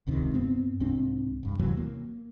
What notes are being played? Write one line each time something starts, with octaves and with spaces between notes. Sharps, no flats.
E1 C#2 C3 D#3
G2 B3 C4
C2 G#2 C4 D4
E1 G2
D#2 C3 E3 F#3
A#3